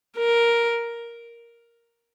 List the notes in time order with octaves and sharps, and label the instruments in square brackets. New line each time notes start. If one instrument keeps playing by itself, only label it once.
[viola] A#4